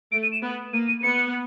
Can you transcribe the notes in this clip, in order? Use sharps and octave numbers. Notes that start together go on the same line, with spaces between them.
A3 D7
D#7
E7
B3
A#3 D#7
D#7
B3 C#7